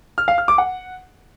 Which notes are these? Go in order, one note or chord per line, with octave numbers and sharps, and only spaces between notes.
F6
F5
F6
D6
F#5